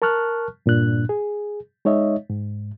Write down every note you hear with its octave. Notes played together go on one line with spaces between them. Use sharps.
A#4 A5 C#6 F6 F#6
G2 A#2 D4 F#6
G#4
G#3 D#4 C#5 D#5 E5
G#2